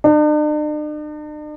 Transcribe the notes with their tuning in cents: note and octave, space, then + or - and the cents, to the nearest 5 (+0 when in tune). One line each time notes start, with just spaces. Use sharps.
D4 +45